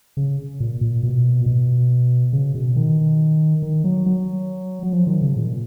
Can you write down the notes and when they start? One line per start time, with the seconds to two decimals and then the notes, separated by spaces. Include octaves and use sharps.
0.17 C#3
0.60 A#2
0.81 A#2
1.03 B2
1.41 A#2
1.46 B2
2.33 C#3
2.55 B2
2.76 D#3
3.63 D#3
3.84 F#3
4.06 F#3
4.83 F#3
4.93 F3
5.07 D#3
5.22 C#3
5.36 A#2